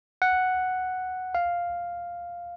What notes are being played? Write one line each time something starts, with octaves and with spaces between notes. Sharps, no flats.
F#5
F5